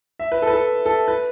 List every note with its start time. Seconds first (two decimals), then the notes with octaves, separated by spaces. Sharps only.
0.19 E5
0.32 B4
0.42 A4
0.47 B4
0.54 A4
0.86 A4
1.08 B4